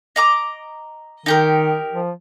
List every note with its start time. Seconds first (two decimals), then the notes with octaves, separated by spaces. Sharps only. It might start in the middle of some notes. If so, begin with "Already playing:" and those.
0.16 D#5 A#5 D6
1.26 D#3 D#4 G4 A#4
1.92 F3